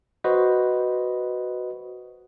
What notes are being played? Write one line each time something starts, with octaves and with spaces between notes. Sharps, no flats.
F#4 B4 C5 D#5